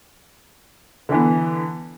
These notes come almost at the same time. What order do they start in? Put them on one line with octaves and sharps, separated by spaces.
D3 E3 B3